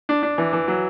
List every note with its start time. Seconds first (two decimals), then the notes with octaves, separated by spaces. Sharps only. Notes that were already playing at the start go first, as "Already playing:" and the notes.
0.09 D4
0.23 D4
0.38 E3
0.53 E3
0.68 F#3